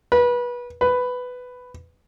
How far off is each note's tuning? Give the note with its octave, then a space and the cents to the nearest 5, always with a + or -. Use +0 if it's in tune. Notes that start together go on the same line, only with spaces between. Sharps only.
B4 -25
B4 +10